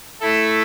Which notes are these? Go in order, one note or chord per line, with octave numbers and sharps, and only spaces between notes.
A3 E4 A4